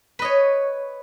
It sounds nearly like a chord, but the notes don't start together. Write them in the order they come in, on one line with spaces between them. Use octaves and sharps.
B4 D#5 C#5